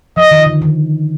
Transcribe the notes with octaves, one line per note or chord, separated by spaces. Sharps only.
F3 D#5
D#3
D3
D#3